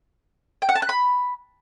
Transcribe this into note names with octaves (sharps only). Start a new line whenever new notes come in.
G5
F#5
A5
F#6
B5